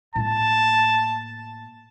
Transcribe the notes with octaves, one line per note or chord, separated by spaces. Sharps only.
A2 A#3 A5